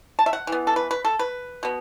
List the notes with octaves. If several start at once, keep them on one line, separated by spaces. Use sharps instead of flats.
A5
E5
F#5
E3 B3
A4
B4
B4
A4
B4
B2 B3